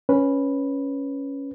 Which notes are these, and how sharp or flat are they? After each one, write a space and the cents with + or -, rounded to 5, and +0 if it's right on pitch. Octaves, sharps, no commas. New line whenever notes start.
C#4 +0 B4 -5